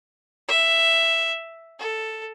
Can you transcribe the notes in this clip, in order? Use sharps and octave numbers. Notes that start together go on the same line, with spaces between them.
E5
A4